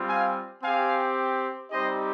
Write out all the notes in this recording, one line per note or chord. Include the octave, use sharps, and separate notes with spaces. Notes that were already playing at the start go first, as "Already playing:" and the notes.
Already playing: G3 C4 F4
F5 G#5
C4 G4 F5 G#5
G3 C4 D#4 G4 C5 D#5